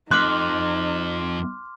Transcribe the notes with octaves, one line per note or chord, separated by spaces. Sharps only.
F2 D#4 C6 D6 F6 F#6